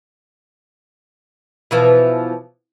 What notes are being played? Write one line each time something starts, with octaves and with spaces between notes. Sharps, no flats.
B2 E3 F3